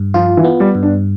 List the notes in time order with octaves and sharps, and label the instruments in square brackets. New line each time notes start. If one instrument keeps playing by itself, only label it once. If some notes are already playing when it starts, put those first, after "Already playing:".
Already playing: [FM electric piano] G2
[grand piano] F3 [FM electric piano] F4
[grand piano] E3
[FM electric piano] B3
[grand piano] G3
[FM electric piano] G2
[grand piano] D4